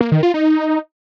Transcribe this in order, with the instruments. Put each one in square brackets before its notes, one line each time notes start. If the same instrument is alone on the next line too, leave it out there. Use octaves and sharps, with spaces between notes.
[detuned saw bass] A#3
D#3
F4
D#4